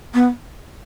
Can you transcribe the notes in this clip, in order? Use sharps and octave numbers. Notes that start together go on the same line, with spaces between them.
B3